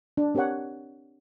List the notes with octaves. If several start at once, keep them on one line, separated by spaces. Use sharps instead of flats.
D4
C4 G4 A#4 C#5 F#5